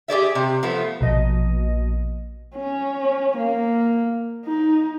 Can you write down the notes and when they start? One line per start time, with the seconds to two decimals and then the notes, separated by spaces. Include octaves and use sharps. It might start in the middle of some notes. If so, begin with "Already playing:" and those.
0.08 G4 G#4 D5 E5
0.35 C3
0.63 F3 A3 B3
1.01 A#1 B2 D#5
2.56 C#4
3.37 A#3
4.46 D#4